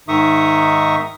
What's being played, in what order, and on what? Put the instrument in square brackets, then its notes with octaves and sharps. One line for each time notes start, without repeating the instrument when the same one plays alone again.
[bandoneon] G#2 D#3 D#4 E5 C#6 D#6